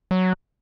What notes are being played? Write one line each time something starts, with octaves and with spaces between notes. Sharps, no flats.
F#3